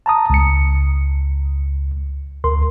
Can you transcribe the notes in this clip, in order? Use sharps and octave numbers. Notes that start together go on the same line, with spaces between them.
A5 A#5 D#6
C#2 C#7
D2 A#4 C6